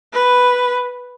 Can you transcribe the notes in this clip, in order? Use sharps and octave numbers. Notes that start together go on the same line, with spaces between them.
B4